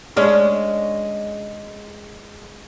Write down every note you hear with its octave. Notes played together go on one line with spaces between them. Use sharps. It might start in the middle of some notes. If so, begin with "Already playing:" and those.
G#3 C#4 D4